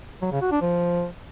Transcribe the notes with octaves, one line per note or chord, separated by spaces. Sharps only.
F#3
C#3
F#4
D4
F3